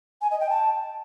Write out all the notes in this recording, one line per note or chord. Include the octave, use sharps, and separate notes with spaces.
G#5
D#5
G5
A5